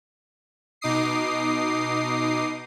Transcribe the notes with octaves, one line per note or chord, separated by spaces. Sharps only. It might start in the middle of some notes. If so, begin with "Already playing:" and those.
B2 D#4 D6 D#6 C7